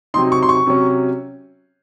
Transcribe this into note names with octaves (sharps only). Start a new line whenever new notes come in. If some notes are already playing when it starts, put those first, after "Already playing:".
C3 F#3 C4 D#4 C6
C#6
C6
C#6
C3 F#3 C#4